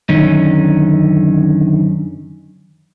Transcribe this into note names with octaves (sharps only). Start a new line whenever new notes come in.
F#2 D3 D#3 C#4 D#4